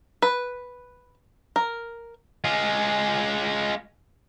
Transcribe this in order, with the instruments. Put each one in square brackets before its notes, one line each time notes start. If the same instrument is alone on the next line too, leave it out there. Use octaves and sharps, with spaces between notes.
[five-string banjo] B4
A#4
[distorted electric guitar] G#3 F4